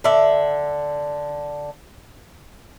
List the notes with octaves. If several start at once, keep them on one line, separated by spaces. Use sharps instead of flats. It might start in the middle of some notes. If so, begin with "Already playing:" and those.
D3 D5 E5